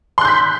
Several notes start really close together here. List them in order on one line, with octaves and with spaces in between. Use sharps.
C6 F#6 G6 B6